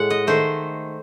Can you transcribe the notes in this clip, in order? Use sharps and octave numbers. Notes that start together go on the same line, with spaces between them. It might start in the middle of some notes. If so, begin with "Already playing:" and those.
Already playing: A2 G#3 F#5
D#5
D#3 A3 C5